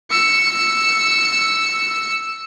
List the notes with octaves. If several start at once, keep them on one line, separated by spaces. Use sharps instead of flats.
E6 C#7